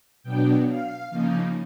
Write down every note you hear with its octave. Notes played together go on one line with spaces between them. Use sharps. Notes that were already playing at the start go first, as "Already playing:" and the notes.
B2 F#3 B3 D4 G5
F5
C#3 F3 A#3 D#4